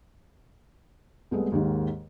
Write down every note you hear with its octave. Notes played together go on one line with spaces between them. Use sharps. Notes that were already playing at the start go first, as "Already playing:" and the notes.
C2 G#3 A3 B3
D#2 G#2 D#3